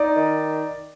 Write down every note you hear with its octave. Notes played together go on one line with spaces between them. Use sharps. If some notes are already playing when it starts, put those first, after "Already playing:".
Already playing: D#4 D5
D#3